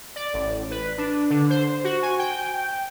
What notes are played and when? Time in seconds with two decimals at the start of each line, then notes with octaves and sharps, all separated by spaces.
0.16 D5
0.34 A1
0.71 B4
0.98 D4
1.30 D3
1.50 C5
1.84 F#4
2.03 G#5
2.19 G5